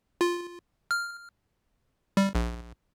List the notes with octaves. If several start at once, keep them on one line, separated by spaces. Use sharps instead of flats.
F4
F6
G3
A#1